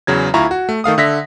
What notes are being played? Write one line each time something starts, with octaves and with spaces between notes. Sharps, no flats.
E2 C#3 F#3 G#6
D2 E4 F4 A#5 C#6
F#4
A3
D#3 A3 F5 D#6
D3 E5 A#6 B6